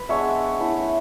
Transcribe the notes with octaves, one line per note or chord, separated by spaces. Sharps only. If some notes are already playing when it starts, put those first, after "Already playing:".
Already playing: B4
G#3 B3 D4 C#5 E5
A3 C#4 E4